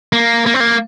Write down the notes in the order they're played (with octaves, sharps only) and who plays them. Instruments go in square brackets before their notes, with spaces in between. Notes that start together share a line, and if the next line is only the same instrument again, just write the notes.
[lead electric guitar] A#3
A#3
C4
A#3